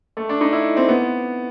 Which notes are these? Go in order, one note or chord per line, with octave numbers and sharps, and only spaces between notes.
A3
D4
D#4
E4
C4
B3